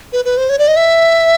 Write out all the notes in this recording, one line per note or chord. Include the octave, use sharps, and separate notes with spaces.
B4
B4
C5
C#5
D5
D#5
E5